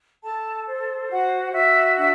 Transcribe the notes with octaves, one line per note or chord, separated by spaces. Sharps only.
A4 A5
C5
F#4 F#5
F#4 E5
D4 E5